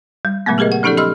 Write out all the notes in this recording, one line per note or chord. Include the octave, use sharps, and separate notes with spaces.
G3
A#2 C#3 F#3 G#3 A3 B3
G4 G#4 A#4 B4 D#5
F#5
F3 C#4 D#4 G4 A4 D5
G4 D#5 B5 C6 E6 F6